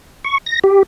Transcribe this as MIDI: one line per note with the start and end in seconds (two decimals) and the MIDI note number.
0.24 0.38 85
0.46 0.59 94
0.64 0.83 67